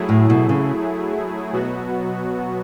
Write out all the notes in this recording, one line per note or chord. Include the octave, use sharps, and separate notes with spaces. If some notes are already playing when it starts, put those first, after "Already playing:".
Already playing: F#3 A3 E4 G#4
A2
B2
C#3
B2 F#3 B3 F#4